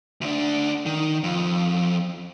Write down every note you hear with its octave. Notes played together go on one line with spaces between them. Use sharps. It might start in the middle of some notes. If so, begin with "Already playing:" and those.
D2 D4
D#3
F2